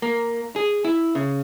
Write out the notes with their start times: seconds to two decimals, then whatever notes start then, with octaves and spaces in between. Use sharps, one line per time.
0.02 A#3
0.56 G#4
0.85 E4
1.15 C#3